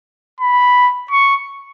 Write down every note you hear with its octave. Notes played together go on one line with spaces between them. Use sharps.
B5
C#6